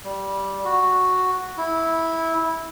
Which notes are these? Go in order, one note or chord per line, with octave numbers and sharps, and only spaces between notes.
G3
F#4
E4